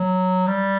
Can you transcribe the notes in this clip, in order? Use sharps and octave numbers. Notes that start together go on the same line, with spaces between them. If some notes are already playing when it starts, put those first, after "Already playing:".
Already playing: F#3
G3